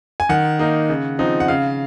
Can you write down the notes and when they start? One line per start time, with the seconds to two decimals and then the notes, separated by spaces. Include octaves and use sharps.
0.20 G#5
0.29 D#3 F#5
0.59 A#3 D#4
0.89 C#3
1.19 F3 C4 D#4
1.40 F#5
1.48 C#3 F5